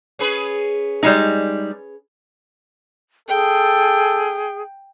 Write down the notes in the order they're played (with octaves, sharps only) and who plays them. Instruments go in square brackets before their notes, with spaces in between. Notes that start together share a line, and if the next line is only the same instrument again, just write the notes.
[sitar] C#4 G#4 B4
[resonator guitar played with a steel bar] G3 G#3 D#4
[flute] G#4 [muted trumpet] A4 [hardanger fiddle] G5